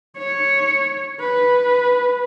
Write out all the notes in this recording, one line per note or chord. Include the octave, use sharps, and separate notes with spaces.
C#5
B4